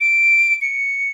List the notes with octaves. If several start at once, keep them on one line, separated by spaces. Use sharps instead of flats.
D7
C#7